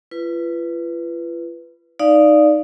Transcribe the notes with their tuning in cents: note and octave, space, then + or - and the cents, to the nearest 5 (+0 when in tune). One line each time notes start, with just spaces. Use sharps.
F4 -40 B4 +0
D#4 -5 D5 +0 F5 +0